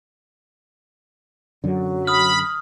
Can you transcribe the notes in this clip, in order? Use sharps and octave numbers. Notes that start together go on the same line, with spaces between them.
F#2 D3 F#3
B5 D#6 F6